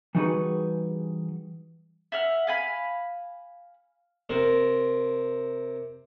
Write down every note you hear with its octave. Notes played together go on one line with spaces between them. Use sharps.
E3 G3 D#4 F#4 G#4 B4
E5 F#5 F6
F5 G#5 B5
C3 A#4